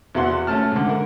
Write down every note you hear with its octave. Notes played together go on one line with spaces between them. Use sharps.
E2 E4 F#4 F#5 C6
A3 C#4 A5 F6
G#2 D3
A#4